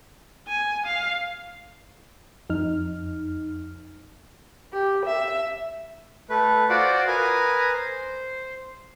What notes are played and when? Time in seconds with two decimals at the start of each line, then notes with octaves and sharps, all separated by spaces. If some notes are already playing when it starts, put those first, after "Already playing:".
0.47 G#5
0.86 F5
2.50 F2 D#4 F6
4.73 G4
5.05 E5
6.30 A3 B4
6.69 F4 F#4 C5 D5 F#5 D6
7.07 A#4 B4 G#5 A#5 D#6
7.73 C5